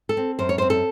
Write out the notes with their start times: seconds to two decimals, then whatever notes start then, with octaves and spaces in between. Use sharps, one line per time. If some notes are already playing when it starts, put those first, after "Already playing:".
0.09 A4
0.17 C4
0.39 F#2 C5
0.49 C#5
0.58 C5
0.62 C4
0.70 A4